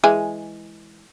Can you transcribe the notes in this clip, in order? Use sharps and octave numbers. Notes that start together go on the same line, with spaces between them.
E3 G#3 G#5